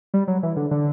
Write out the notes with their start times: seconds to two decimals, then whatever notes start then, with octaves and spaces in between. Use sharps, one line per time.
0.14 G3
0.28 F#3
0.43 E3
0.56 D3
0.71 D3